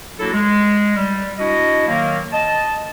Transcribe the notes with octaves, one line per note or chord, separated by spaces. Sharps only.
F#3 A#3 D4 E4 F#4 A4
G#3
G3
D4 E4 F#4 D#5
D#3 F#3 A#3
D#5 A5